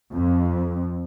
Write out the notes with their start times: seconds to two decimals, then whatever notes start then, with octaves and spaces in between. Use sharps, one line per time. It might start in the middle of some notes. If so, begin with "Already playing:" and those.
0.13 F2